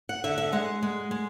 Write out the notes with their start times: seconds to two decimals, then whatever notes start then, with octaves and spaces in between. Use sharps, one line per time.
0.09 F#5
0.24 D3 E5
0.38 E5
0.52 G#3 F#5
0.83 G#3
1.11 G#3